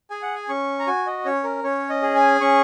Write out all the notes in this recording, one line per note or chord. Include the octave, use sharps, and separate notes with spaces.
G#4 G#5
F#5
G#5
C#4 C#6
A#5
F#4 G#5
D#5
C#4 C#5
A#4
C#4 C#5
D#5
G#4
G#5
C#4 C#6